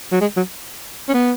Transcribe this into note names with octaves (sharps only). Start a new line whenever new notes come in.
F#3
G#3
F#3
C#4
B3